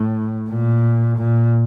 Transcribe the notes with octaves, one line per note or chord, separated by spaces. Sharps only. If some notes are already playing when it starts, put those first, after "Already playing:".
Already playing: A2
A#2
A#2